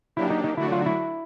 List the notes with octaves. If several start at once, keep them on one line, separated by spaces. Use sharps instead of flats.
F#3 A#3 D4 E4 G4
D#4
D#4
D3 F#3 A3 D4 E4 F#4
F4
E4